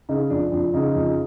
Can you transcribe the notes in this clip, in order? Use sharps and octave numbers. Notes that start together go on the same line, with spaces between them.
C#3 D#4
F2 D4
F2 D4
C#3 D#4
F2